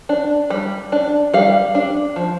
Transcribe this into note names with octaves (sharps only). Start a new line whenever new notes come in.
D4
G3
D4
G3 F5
D4
F3